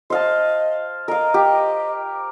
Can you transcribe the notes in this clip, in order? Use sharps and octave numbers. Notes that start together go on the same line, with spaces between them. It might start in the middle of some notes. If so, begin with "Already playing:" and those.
C5 D#5 F5 A5
A#4 D#5 F5
G4